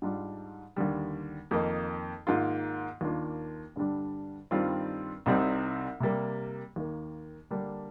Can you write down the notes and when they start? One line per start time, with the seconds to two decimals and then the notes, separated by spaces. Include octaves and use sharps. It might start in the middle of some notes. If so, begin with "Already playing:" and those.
0.02 G#2 G3 D4 F4
0.76 D#2 D3 G3
1.51 F2 D#3 A#3 D#4
2.27 G#2 D#3 A#3 F4
3.01 D#2 D#3 A#3 D4 F4
3.76 G2 D3 G3 D4
4.51 G2 D#3 G3 C4 F4
5.26 C2 C3 G3 C4 D#4
6.00 C3 G3 A#3
6.76 D#2 D#3 A#3
7.51 D3 G3 A#3 D4